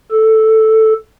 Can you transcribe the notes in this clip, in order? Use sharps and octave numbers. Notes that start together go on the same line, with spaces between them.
A4